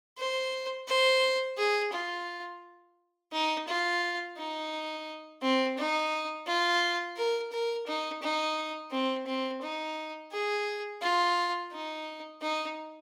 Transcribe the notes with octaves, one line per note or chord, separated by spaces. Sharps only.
C5
C5
G#4
F4
D#4
F4
D#4
C4
D#4
F4
A#4
A#4
D#4
D#4
C4
C4
D#4
G#4
F4
D#4
D#4